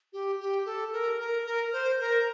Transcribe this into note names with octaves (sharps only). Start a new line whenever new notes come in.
G4
G4
A4
A#4
A#4
A#4
C5
A#4